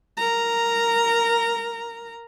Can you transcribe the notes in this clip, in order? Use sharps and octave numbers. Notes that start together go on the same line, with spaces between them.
A#4 A#5